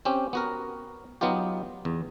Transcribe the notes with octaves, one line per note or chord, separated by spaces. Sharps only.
C4 C#4 G4
B3 F#4 A#4
F#3 B3 D#4 F4 G4
E2